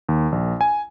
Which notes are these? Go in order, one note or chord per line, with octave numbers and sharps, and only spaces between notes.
D#2
A#1
G#5